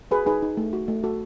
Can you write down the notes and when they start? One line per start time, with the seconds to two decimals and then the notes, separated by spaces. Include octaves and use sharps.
0.11 F#4 G#4 B4
0.26 D#4 G#4 B4
0.42 D#4
0.57 A3
0.73 F#4
0.88 A3
1.04 F#4 A4